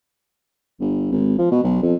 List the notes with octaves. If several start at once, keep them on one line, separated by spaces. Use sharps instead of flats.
G1
G#1
F3
B2
B1
F2